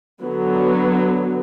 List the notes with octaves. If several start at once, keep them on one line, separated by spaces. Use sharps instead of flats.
D3 F#3 B3